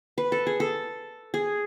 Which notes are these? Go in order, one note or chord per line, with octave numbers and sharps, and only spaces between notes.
B4
A4
G#4
A4
G#4